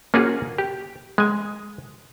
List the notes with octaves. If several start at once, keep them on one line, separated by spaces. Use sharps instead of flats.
A#3 C#4 F4 F#4 G#4
G4
G#3 G#5